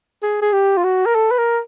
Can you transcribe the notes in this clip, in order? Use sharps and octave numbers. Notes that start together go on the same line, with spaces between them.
G#4
G#4
G4
F4
F#4
A#4
A4
B4
A#4